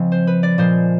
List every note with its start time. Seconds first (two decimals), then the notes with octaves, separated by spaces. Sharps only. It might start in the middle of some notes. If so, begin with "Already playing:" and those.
Already playing: C#3 F3 G#3 C4 G#4
0.12 C5
0.27 B4
0.43 D5
0.58 A#2 F3 G#3 C5